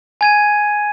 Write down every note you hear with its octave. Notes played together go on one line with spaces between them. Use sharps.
G#5 G#6 D#7